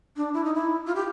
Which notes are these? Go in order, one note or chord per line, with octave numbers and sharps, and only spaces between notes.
D4
E4
D#4
E4
F4
G4